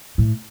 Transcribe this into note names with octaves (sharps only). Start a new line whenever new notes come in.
A2